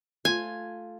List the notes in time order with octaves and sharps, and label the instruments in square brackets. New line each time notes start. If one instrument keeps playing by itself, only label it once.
[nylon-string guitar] A3 F4 [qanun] G#5